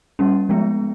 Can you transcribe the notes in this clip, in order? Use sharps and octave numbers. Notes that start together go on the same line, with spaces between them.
G3 A#3 C#4
F3 G#3 B3